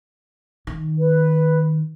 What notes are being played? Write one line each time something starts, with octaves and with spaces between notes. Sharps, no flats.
D#3
B4